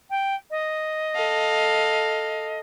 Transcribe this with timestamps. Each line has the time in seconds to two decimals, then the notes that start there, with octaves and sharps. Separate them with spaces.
0.10 G5
0.51 D#5
1.15 A4 F5